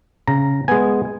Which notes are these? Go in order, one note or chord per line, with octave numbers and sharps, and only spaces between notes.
C#3 A#5
G#3 B3 G#5